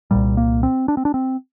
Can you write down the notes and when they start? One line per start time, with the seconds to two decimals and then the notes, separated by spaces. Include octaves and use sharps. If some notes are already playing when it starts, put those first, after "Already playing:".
0.11 C2 A#2 G3
0.37 A#3
0.63 C4
0.88 D4
0.97 C4
1.05 D4
1.14 C4